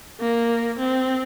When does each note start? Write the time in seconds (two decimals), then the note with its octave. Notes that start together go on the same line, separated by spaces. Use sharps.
0.21 A#3
0.79 C4